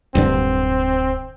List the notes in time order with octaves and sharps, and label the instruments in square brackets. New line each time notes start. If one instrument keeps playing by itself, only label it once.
[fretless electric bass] D1 G2 D3 [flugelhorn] C4